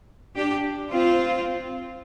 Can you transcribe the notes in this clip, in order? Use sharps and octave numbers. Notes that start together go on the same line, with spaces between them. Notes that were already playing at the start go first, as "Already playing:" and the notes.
D4 G4
C4 F4